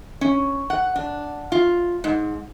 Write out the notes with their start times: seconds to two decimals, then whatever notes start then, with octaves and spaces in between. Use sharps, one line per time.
0.21 C#4
0.70 F#5
0.96 D4
1.52 F4
2.04 G#2